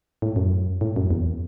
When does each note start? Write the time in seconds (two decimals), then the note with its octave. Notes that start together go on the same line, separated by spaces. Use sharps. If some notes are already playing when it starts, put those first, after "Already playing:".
0.22 A2
0.36 F#2
0.81 A2
0.96 F#2
1.11 E2